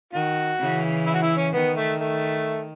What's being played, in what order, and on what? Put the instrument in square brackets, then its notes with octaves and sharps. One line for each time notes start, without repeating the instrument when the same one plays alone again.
[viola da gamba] D#3 [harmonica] F#4
[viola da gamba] C#3 E3
[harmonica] E4
F#4
E4
C#4
[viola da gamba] D#3 [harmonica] B3
[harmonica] A3
A3